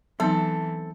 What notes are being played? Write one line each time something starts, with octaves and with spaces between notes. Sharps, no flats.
E3 F#3 B3 C4 D#4 A4